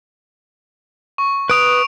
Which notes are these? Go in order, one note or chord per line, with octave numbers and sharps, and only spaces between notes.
C#6
B4 D#6 D7 F7